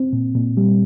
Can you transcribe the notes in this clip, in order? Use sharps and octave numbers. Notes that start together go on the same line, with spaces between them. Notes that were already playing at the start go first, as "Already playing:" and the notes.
Already playing: C4
A#2
A#2
G3